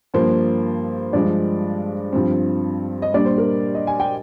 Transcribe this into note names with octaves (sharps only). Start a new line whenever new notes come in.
G2 F3 A#3 C5
G2 F3 G#3 D4 D5
G2 F3 C4
D#5
A#2 G3 D4 D5
C5
A#4
D#5
G#5
G5